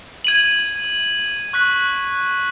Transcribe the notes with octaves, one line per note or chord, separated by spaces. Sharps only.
G#6 D#7 F#7
C#6 F#6 B6